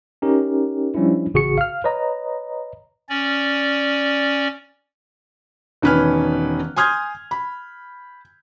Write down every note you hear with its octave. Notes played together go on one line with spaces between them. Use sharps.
C#4 D#4 G4 A#4
F3 G3 C#4 D4 E4
A1 C#3 F#4 G#4 C#6 C#7
F5 F6
B4 C#5 D#5 A#5
C#4 D5
E1 D#3 C#4 B4 G#5 F6
G#5 C6 D#6 F6 G6 G#6
B5